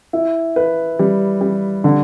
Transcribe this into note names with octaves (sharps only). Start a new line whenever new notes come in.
E4
B4
G3
G3
D3